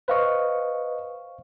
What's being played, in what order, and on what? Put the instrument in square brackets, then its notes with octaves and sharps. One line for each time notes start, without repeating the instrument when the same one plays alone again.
[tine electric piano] B4 D#5 [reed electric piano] C5 F5 C#6